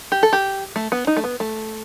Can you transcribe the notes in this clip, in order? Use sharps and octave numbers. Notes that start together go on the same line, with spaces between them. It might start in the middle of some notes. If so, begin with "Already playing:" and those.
G4
A4
G4
A3
B3
D#4
A3
B3
A3